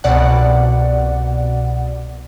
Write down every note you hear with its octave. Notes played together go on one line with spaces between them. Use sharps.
C2 B2 D5 F#5